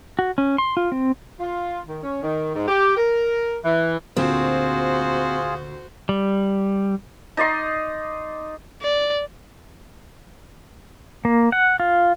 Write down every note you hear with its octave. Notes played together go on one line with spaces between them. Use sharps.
F#4
C#4
C6
F4
C4
F4
D#3
C#4
D#3
G#2
G4
A#4
E3
D2 A#2 C4 F4 F#4 G#4 C5
G3
D#4 D5 D#5 C6
D5
A#3
F#5
F4